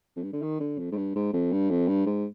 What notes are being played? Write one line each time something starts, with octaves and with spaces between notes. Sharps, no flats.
F2
G2
D3
D#3
D3
F2
G#2
G2
G#2
F2
G2
F2
G2
G#2